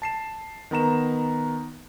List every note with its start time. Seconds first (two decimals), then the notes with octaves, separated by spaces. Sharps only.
0.02 A5 C7 E7
0.71 D#3 B3 A#5 E7